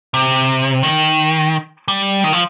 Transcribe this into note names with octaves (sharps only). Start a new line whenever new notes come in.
C3
D#3
G3
D#3
F3